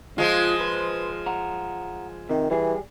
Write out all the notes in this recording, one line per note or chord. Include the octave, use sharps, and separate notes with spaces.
F3 G#3 F4
B4 C5
F#5 A#5
C3 D#3
E3 G3 G#4